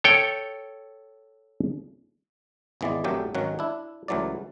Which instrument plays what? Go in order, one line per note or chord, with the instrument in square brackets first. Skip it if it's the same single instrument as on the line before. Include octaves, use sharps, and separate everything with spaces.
[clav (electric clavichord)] A4 C#5 G5
G#1 E2 E3 G#3 B3 D5
A#1 F2 A#2 F#3 A3 G4
G#1 D#3 F#3 C#4 F#5
D4 E4
C#2 E3 F#3 A3 D5